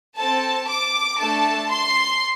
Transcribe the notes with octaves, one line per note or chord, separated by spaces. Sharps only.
C4 A4 A5
D6
A3 D4 A4 A5
C6